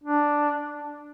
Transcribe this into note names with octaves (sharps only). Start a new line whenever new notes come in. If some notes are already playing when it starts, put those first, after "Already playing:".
D4